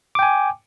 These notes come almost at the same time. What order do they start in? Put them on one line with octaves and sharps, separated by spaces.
D6 G5 G#5